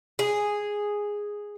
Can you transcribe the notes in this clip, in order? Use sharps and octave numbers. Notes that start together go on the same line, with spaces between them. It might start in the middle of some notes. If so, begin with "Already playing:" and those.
G#4